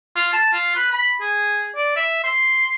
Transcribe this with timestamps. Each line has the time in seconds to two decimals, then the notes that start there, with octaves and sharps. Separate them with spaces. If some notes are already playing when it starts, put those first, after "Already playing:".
0.16 F4
0.33 A5
0.53 F4
0.75 B4
0.91 B5
1.21 G#4
1.76 D5
1.96 E5
2.24 C6